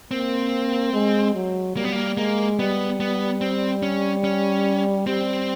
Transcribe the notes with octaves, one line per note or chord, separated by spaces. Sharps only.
A#3 C4
G#3
F#3
G3 A#3
B3
A#3
G#3 A#3
G3 B3
B3
C4
C#4
C#4
G3 C4